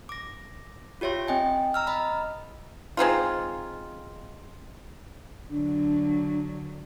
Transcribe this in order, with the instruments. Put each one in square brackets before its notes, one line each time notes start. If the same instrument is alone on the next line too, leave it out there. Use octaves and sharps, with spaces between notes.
[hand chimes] D6 A#6
F4 G4 C#5 E5 C6
C4 D#5 G5 G#5
A#5 E6 F6
D#5 A#5 B5
[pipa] G#3 C4 D#4 F4
[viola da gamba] D3 F#3 [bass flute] D4